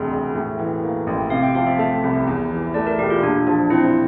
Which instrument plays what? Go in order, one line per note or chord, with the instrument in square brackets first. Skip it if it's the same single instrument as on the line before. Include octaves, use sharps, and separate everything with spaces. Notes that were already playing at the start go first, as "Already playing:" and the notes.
Already playing: [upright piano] E1 D2 C3
E1
A2
E3
A#3
A1
[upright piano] C3 [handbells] F5
[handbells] G5
[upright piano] F3 [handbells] F5
[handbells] E5
[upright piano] A3 [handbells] E5
[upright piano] C2
E2
E3
[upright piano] A3 [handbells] D5
[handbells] A#4
[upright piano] E1 [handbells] G4
[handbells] F4
[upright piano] A#2 [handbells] D4
[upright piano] F3 [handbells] D4
[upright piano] C4 [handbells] E4